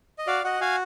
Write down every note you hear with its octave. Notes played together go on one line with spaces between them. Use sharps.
D#5
F#4 D5 F5
F#4 D#5 F#5
F#4 F5 G#5